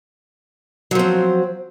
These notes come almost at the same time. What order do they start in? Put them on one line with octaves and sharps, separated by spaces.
F#3 F3 C4